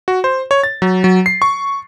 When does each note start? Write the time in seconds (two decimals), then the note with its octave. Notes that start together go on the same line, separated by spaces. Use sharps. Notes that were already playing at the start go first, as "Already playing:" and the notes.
0.08 F#4
0.24 C5
0.51 C#5
0.63 A6
0.82 F#3
1.04 F#3
1.26 C7
1.42 C#6